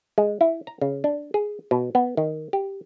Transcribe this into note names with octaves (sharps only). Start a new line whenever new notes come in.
G#3
E4
A#5
C#3
D4
G#4
B2
B3
D#3
G4